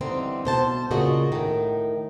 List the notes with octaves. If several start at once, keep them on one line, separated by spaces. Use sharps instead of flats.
D3 E3 G3 C4 D#4
B2 C5 A5
A#2 C#3 F#4 G#4 D#5
A2 D#3